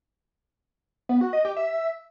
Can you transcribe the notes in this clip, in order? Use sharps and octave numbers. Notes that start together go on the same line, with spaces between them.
B3
F#4
D#5
G4
E5